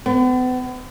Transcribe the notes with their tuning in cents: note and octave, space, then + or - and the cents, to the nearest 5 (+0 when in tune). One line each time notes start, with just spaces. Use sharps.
B3 +40